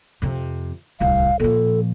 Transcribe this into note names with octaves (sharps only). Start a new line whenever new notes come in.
F2 C3
D1 C2 F5
A#2 F3 A4